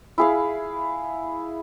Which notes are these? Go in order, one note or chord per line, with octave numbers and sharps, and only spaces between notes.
E4 G#4 F5